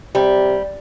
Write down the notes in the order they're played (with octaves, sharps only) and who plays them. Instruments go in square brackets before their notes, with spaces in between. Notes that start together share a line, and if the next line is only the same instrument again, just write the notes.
[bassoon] C3 [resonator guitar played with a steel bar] G3